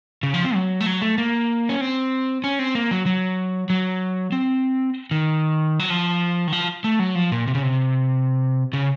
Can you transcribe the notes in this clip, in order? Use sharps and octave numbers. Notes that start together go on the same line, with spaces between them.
C#3
F3
C4
F#3
A3
F#3
A3
A#3
C#4
C4
C#4
C4
A#3
F#3
F#3
F#3
C4
D#3
F#3
F3
D#3
F3
A3
F#3
F3
A#2
C3
C#3
C3
C#3